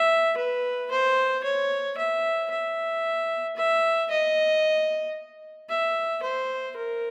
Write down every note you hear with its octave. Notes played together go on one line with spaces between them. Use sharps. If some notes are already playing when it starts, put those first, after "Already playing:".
Already playing: E5
B4
C5
C#5
E5
E5
E5
D#5
E5
C5
A#4